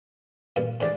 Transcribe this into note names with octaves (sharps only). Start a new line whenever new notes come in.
E2 G2 A#2
A1 G#2 D5